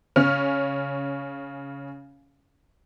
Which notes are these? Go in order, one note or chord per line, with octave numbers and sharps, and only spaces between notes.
C#3 C#4 F6